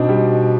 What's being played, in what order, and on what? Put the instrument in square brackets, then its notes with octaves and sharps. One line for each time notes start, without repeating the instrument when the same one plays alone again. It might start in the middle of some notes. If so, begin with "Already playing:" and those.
Already playing: [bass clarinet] B2 [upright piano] C4 D4 D#4
[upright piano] G3